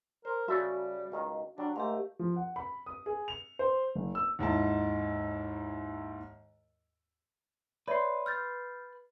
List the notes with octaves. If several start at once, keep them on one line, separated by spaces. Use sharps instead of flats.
A#4 C5
C#3 G3 F#4 A4 E5
C#2 D#3 F5
F#3 G3 D4
G#2 A3 G4 A#4 F5
F3
F#5
B5
D#6
G#4
F7
C5
F#1
E6
D#2 G#2 E4 A5
B4 C#5 D5 E5 C6
F6 G6 A6